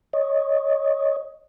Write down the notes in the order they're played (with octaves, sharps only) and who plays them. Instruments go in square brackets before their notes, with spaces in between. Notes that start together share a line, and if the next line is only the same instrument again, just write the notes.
[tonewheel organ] C#5 D#5